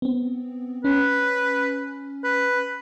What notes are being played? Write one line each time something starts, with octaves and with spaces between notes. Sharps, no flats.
B3 C4
C#4 B4
B4